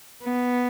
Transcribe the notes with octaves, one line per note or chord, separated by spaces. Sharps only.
B3